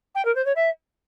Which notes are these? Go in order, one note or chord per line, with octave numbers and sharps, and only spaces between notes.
G5
A#4
C5
C#5
E5